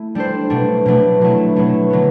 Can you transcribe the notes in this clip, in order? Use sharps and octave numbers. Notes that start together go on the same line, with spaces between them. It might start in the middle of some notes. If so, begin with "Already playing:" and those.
Already playing: A3 E4
G3 D4 A4 C5
B2 F#3 A3 D4
B2 F#3 A3 D4
B2 F#3 A3 E4
B2 F#3 A3 E4
D3 F#3 B3